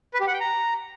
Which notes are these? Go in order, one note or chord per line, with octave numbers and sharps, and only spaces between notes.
B4
G4
F#5
G5
A#5